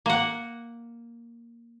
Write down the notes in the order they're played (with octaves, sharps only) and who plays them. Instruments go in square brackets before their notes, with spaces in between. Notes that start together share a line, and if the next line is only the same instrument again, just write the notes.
[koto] A#3 F#5